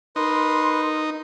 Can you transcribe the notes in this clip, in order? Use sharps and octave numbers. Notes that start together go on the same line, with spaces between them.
D#4 A#4 B4 C6